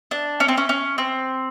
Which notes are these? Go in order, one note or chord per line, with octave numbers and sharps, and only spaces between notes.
D4
C#4
C4
C#4
C#4
C4